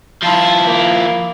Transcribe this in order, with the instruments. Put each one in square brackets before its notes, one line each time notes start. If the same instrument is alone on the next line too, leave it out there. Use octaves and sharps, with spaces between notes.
[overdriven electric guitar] F3 E4 [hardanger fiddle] F4 A5
[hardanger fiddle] A#3